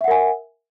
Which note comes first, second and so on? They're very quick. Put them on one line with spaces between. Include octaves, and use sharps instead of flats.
E5 F#5 A#4 G#5